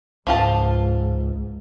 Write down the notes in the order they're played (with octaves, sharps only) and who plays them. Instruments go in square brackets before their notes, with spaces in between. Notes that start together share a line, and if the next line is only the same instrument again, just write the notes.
[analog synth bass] C#2 [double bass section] G#2 [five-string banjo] F3 F4 A5